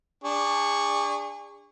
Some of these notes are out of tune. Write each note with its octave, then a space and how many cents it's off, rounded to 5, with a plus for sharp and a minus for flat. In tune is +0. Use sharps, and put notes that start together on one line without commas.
D4 +0 G#4 -35 C#6 +0